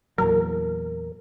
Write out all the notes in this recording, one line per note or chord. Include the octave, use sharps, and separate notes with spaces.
E2 A#2 F#3 A#4